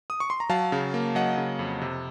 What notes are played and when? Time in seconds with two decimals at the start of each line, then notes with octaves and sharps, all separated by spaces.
0.10 D#6
0.20 C#6
0.30 C6
0.40 A#5
0.49 F#3 F5 A5
0.72 C#3
0.94 A#3
1.15 F#3 D#5 F#5
1.37 C#3
1.59 F2
1.81 C3